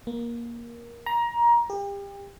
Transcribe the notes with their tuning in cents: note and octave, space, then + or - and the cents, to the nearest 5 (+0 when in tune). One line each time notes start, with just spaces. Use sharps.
A#3 +15
A#5 +20
G4 +35